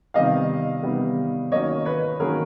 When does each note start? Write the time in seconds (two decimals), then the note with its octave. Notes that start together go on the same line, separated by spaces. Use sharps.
0.14 C3 D#3 G3 B3 D#5 F5
0.83 C3 D#3 G3 B3
1.51 D#3 F#3 A#3 C#4 C#5 D#5
1.85 B4 C#5
2.20 D#3 F#3 A#3 C#4 G#4 A#4